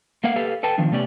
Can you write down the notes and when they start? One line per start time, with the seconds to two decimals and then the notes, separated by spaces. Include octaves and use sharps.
0.24 A3 A#3 A#4 F5 F#5
0.36 G4 A4 B4 F5
0.63 A4 B4 G5 A5
0.78 D#3 F3 B3 D4
0.92 C3 A3 B3 C#4 G4 D5